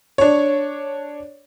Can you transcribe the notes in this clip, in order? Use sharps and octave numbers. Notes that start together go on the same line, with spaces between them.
D4 C#5